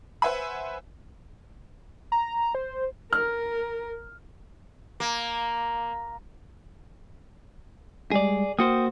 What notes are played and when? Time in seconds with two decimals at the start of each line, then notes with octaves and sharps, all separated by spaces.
0.22 B4 C5 E5 F#5 G#5 B5
2.12 A#5
2.55 C5
3.13 A#4 F6
5.00 A#3
8.11 G3 G#3 G#4 D5
8.59 A#3 F#4 C5 G5 D#6